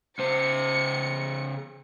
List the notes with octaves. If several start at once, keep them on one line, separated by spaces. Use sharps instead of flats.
C#3 C5 C#7